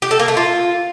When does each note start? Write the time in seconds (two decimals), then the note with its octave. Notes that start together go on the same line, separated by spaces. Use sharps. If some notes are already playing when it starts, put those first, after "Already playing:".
0.02 G4
0.11 A4
0.19 A#3
0.28 A3
0.37 F4